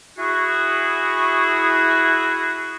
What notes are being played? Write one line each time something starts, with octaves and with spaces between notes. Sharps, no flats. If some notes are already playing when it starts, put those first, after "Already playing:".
E4 F#4 G#4